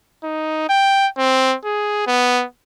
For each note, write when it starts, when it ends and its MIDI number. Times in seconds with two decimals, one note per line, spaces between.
0.24 0.65 63
0.69 1.07 79
1.18 1.56 60
1.65 2.04 68
2.07 2.44 59